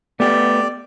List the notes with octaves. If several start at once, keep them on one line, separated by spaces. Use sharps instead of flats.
A3 B3 G4 D5